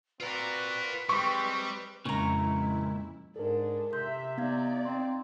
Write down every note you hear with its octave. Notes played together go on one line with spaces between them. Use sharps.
C4 F4 F#4 A#4 B4 D5
G3 G#3 C4 C#6
F2 A#2 C#3 G#3 E4 A#5 C#6
G#2 G#3 D4 A4 A#4
C3 E5 C6 G6
B3 D#4 D5 F5 G#6
C4 C6